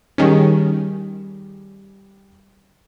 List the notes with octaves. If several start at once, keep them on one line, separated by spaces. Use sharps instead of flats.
D#3 G3 C#4 G#4